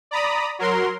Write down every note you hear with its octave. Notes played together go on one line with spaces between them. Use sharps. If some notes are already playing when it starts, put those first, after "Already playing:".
D5 A#5 B5 D#6
F#3 A#4 C6